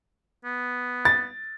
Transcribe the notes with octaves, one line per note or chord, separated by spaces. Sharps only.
B3
A6